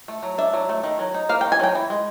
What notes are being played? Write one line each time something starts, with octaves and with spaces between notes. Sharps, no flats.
A3
F#3
D4 E5
F#3
A3
D#3
F#3
D#4
A#3 F5
G5
D#3
G#5
F#3 G5
E3
G#3